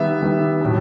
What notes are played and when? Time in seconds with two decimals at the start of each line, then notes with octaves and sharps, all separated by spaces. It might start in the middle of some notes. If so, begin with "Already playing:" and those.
Already playing: D#3 G3 B3 E5
0.22 D#3 G3 B3
0.61 A2 F#3 B3